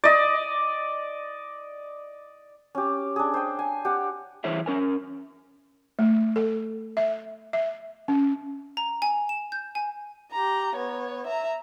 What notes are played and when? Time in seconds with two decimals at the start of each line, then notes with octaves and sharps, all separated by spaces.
0.04 D5 D#5
2.75 C#4 G4
3.16 D4 G#4
3.34 C5 G5
3.59 G#5
3.85 G4 F#5
4.44 E3 E4 G#4 C5 C#5 E5
4.66 C#4 A#4 G#5
5.99 A3
6.36 A4
6.97 E5
7.53 E5
8.08 C#4
8.77 A#5
9.02 G#5
9.29 E7
9.52 G6
9.75 G#5
10.31 G4 A#5
10.75 B3 C#5
11.27 E5 A#5